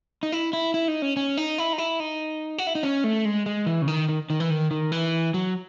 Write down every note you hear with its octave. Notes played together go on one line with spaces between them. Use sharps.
D#4
E4
E4
E4
D#4
C#4
C#4
D#4
E4
D#4
E4
D#4
F#4
E4
D#4
C#4
A3
G#3
G#3
E3
C#3
D#3
D#3
D#3
E3
D#3
D#3
E3
F#3